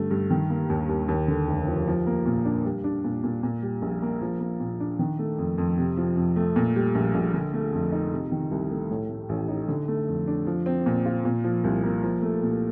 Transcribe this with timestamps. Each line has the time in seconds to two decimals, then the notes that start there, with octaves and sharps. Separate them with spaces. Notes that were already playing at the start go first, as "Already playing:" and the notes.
Already playing: G2 D3 A3
0.11 G2
0.30 D#3
0.50 A#3
0.70 D#2
0.89 D#2
1.08 D#2
1.28 D3
1.48 F1
1.67 F3
1.87 F3
2.07 A#3
2.26 A#2
2.45 D4
2.65 G3
2.84 D4
3.04 A#2
3.24 A#2
3.43 A#2
3.63 G3
3.82 A#1
4.02 A#3
4.22 F3
4.40 A#3
4.60 A#2
4.80 D4
4.99 D#3
5.19 A3
5.39 F2
5.58 F2
5.78 C3
5.97 F3
6.17 F2
6.36 A3
6.56 A#2
6.76 G3
6.95 A#1
7.14 A#1
7.34 D3
7.53 A3
7.73 F2
7.92 D#4
8.12 C3
8.32 D#3
8.51 C2
8.71 A3
8.90 A2
9.10 A3
9.29 A1
9.48 D#4
9.69 D3
9.88 A3
10.07 F2
10.28 D4
10.47 F3
10.66 C4
10.86 A#2
11.06 F4
11.25 A#2
11.44 F3
11.64 C2
11.83 A#3
12.03 F3
12.22 A3
12.42 A#2